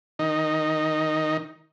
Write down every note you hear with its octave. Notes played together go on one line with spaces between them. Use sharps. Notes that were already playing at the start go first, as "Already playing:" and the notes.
D#3 D#4